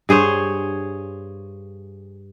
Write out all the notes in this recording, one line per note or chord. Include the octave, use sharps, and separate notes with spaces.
G2 G#4 C5 C#5